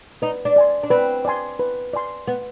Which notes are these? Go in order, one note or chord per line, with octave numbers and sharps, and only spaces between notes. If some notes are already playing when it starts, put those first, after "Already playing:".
D#4 B4
D4
D5 G#5 C6
D4
C4 B4
D5 G#5 C6
B4
D5 G#5 C6
B3 B4